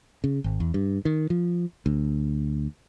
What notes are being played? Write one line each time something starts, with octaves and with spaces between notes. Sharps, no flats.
C#3
G#1
E2
G2
D#3
F3
D2